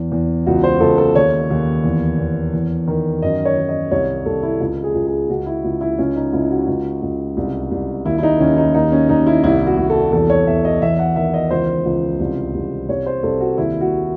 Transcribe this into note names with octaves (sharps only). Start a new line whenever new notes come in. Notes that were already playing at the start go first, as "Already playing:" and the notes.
Already playing: E2
E2
C#2 F#4
C5
C#2 A4
A4
D#2 C#5
D#2
E2
E2
E2
D#3
F#2 D#5
C#5
D#3
D#5
C2 C#5
C2 A4
E4
C#2
G#4
C#2
G#4
C#2 F#4
E4
C#2
E4
C#2 C#4
D#4
C#2 E4
F#4
C#2
C#2
C2
C2
D#2 E4
E4
D#4
D#2 C#4
D#4
D#2 D#4
C#4
D#2 D#4
E4
C2 E4
F#4
C2
A4
E2 A4
C#5
E2 E5
D#5
E2 E5
F#5
D#3 E5
D#5
C#2 C5
C#2
C2
C2
C2 C#5
C5
C2 A4
F#4
D#2 E4
F#4